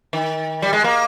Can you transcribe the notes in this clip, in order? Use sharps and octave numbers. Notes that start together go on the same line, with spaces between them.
D#3
G3
G#3
A#3